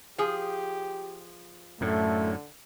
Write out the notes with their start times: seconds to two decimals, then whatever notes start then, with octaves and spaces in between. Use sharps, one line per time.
0.18 F3 G4 G#4
1.81 F#2 A2 D3 A3